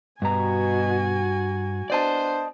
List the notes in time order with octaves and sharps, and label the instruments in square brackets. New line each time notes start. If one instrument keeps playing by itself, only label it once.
[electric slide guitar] G2 A#5 [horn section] B2 [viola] F#4 G#5
[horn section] B3 D4 C5 [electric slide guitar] D5 D#5 A5